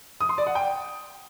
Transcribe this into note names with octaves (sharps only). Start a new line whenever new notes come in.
D#6
C6
D5
F#5
G5